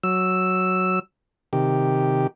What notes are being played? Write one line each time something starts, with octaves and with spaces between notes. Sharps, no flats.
F#3 E6
C3 D#3 G4